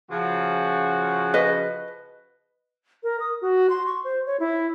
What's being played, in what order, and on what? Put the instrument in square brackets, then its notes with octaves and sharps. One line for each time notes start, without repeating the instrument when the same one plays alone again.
[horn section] C#3 F3 F#4
[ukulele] B4 D#5
[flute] A#4
D#6
F#4
C6
C#6
C5
C#5
E4